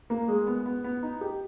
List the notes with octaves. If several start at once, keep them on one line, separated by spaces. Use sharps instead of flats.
A#3
G#3
B3
B3
B3
D#4
G4